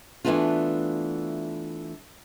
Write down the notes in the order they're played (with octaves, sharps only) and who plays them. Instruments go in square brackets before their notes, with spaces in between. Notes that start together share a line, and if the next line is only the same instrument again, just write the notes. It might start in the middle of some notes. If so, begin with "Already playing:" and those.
[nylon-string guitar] E3 F3 A3 B3 D4 F4